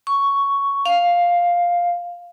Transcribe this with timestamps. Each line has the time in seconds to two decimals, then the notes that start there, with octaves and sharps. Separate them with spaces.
0.07 C#6
0.86 F5